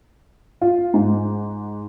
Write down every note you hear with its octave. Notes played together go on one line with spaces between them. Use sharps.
F4
G#2